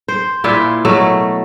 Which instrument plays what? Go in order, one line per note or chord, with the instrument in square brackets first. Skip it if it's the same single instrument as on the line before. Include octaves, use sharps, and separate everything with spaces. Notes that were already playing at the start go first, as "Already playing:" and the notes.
[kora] C5
A#2 E4 F4
B2 F#3 A3 A4